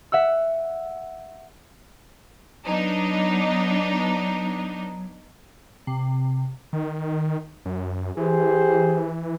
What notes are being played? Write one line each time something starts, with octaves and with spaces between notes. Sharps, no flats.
E5 F#5 E6
F#3 B3 D4 D#4
C3
D#3
F#2
E3 G4 G#4 C5